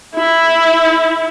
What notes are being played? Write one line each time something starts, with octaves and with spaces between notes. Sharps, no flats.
E4